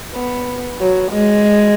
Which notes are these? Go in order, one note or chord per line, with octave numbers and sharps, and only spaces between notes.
B3
F#3
G#3